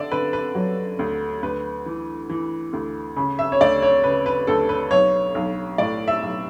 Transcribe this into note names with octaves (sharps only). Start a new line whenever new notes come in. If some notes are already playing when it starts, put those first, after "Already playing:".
Already playing: D3 D5 E5
D3 B4
B4
F#3
D2
D2 B4
E3
E3
D2
C#3
E5
C#5
D2 D5
C#5
C#3 B4
B4
D2 A4
B4
B1 C#5
B1
A2 D5
E5
B1